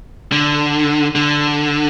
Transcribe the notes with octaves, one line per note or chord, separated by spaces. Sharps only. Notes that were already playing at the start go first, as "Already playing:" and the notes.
D3
D3